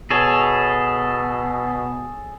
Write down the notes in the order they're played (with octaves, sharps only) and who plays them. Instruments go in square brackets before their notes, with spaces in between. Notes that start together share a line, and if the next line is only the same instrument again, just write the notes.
[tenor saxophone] B2 [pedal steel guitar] G#4 A4 C#5